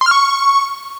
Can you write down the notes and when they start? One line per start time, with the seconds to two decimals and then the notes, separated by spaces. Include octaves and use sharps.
0.01 C6
0.06 F6
0.11 C#6